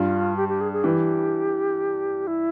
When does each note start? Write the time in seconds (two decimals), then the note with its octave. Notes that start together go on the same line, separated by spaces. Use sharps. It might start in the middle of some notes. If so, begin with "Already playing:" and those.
Already playing: G2 F4
0.37 G4
0.48 G4
0.61 G#4
0.73 G#4
0.84 E3 G4
2.27 E4